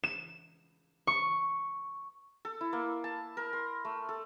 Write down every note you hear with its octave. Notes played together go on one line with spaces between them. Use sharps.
E7
C#6
A4
E4
A#3
A5
A#4
C6
A3
A4